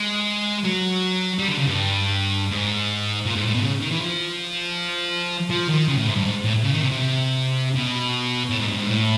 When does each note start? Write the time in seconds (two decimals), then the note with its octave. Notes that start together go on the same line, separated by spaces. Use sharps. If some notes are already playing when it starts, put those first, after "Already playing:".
Already playing: G#3
0.64 F#3
1.39 G3
1.48 D3
1.58 C#3
1.67 G2
2.51 G#2
3.26 A#2
3.35 G#2
3.44 A2
3.54 B2
3.63 C#3
3.81 D#3
3.91 E3
4.01 F3
5.50 F3
5.69 D#3
5.88 C#3
5.97 A2
6.07 G#2
6.15 G2
6.25 G#2
6.44 A2
6.63 C#3
6.72 D#3
6.81 C3
6.91 C3
7.75 B2
8.50 A2
8.59 G#2
8.68 G2
8.78 G#2
8.87 A2